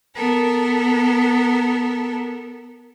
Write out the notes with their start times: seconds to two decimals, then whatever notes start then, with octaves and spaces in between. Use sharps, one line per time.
0.15 B3 A4 A#4